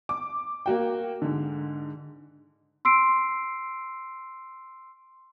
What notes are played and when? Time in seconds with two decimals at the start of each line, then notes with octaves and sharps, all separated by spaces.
0.09 D6
0.66 A#3 F#4 G5
1.22 G#2 D3
2.85 C6 E6 C7 D7